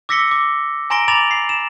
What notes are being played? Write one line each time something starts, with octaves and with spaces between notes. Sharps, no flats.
D6 E6 A#6 B6 C#7 G7
D6
G#5 A#5 C6 A#6 D7 G7
A#5 B5 D6 A6 F7 F#7
C7
E7